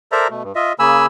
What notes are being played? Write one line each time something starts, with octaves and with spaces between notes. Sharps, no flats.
A4 A#4 C5 D5 E5 A#5
B2 A3
G2
F4 D#5 E5
C#3 A#3 G#5 B5 E6